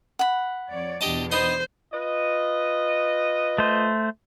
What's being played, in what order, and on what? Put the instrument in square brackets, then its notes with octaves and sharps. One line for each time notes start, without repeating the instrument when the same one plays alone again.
[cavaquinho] F#5 B5
[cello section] F2 C#5 D5
[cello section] E2 B2 D4 [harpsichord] G4 D#5 A5
[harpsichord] B3 D#4 C6 [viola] C5
[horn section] F4 B4 D#5
[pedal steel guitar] A3 C5